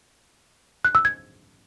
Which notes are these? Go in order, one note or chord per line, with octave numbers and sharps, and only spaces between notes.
F#6
E6
G#6